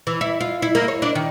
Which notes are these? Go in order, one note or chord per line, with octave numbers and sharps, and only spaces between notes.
E3
E4
F4
E4
A#3
C#5
D4
D#3